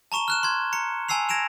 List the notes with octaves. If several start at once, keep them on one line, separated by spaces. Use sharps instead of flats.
A5 A#5 C#6 E7 G7
F6 F#6 E7
C6 G#6
A#5 C#7
G#5 A5 E6 C7 F7
G#6 A#6 D7 E7 F7